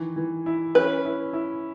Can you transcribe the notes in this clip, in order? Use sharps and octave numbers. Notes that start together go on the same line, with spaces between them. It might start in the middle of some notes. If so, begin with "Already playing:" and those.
Already playing: D#3 E3
E3
E4
C#4 B4
E4
E4